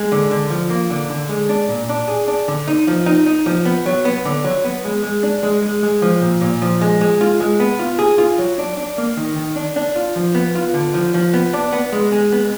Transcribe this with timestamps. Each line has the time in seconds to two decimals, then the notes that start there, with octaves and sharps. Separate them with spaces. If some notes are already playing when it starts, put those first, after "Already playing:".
Already playing: G#3
0.12 D3
0.31 D3
0.50 F3
0.70 A#3
0.90 D3
1.10 D3
1.29 G#3
1.49 D4
1.69 A#2
1.89 D4
2.08 G#4
2.28 D4
2.48 D3
2.67 D#4
2.87 F3
3.06 D#4
3.26 D#4
3.46 F3
3.65 B3
3.86 F#3
4.05 B3
4.25 D3
4.44 F#3
4.64 B3
4.85 G#3
5.03 G#3
5.23 D4
5.43 G#3
5.62 G#3
5.83 G#3
6.02 F3
6.21 A#2
6.41 A#2
6.62 F3
6.81 G#3
7.01 G#3
7.21 F4
7.40 G#3
7.60 B3
7.79 F4
7.99 G#4
8.18 F4
8.38 F#3
8.58 D4
8.77 D4
8.98 A#3
9.17 D#3
9.36 D#3
9.56 D4
9.76 D4
9.96 F4
10.16 F3
10.35 B3
10.55 F4
10.74 D3
10.94 F3
11.14 F3
11.33 B3
11.53 D4
11.73 B3
11.92 G#3
12.12 G#3
12.32 B3